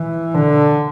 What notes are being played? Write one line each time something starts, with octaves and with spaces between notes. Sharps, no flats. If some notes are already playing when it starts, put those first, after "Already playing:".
Already playing: E3
D3